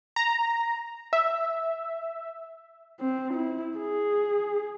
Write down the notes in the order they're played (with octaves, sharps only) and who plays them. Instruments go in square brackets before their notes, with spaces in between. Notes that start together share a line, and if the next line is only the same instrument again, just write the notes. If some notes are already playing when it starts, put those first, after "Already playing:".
[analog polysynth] A#5
E5
[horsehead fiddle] C4
E4
G#4